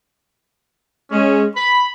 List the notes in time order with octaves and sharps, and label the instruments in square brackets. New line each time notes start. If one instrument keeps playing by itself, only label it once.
[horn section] G#3 C#4
B5